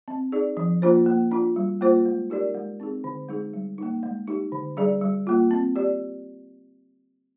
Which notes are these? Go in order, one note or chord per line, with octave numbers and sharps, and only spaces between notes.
C4
D#4 G#4 D5
F3
A#3 D4 F4 C5
A#3
D4 F4
G3
A#3 F4 C5
G#3
D#4 G4 A#4 D5
G#3
C4 D#4 G#4
D3
G#3 D#4 G#4
G3
A#3 D#4
G#3
D#4 G4
D3
G3 D4 G#4 D5
G3
A#3 F4
C4
G4 D5